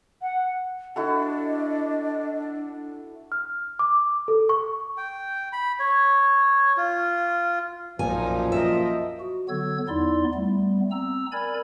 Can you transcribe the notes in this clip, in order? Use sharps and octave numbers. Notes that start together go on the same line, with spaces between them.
F#5
D4 E4 F#4 A4 D#5
F6
D6
A4
C#6
G5
B5
C#5
F4
B1 F#2 A#2 F3 D#4 G#5
A#4 D#5 E5
F#4
D3 F#3 B3 E6 G#6
E2 B3 D#4 E4 D5 C6
G3 A3 B3
C4 A#5 E6
A#4 D5 G#5 B5 G#6